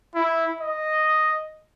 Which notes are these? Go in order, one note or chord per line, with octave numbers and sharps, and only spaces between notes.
E4
D#5